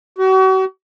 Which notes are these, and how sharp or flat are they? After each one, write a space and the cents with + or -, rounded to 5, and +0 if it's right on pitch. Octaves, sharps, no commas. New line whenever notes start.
F#4 +40